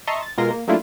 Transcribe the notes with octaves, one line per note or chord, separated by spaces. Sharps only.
D#5 E5 A5 A#5 C6 C#6
A6
B2 G#3 F4 A#4 C6 A#6
A#3
F#3 A3 A#3 D4 E4 F4